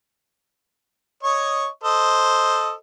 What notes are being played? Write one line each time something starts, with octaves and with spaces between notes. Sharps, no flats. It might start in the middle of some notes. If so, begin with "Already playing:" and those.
C#5 D#5 C#6
A4 C5 D#5